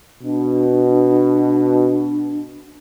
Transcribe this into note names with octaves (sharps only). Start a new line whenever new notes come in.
B2 D4